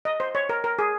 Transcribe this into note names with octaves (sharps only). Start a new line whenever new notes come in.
D#5
C5
C#5
A#4
A#4
G#4